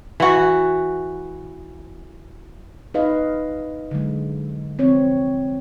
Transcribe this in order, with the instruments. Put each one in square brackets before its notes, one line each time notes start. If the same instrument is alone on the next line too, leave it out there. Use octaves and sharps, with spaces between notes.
[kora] E3 F#4
[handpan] D#4 B4 D#5 F5
D3 F#3 G#3
F3 C4 C#5